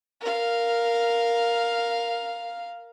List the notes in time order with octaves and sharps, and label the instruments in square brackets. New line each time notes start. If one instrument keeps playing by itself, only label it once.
[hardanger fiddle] A#4 F5